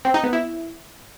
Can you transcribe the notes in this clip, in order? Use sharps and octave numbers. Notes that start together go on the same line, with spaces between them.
C4
D#4
B3
E4